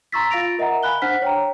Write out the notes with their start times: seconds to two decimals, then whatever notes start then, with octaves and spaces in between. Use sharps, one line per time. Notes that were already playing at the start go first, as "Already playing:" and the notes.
0.12 A#5 C6 C#6 E6 A6 B6
0.30 F4 F5 A6 A#6 D7 F7
0.59 A#4 D#5 E5 F#5 A#5
0.83 F5 G#5 B5 F#6 G7
1.02 D4 C5 F#5 F6 B6
1.22 C#5 G5 A#5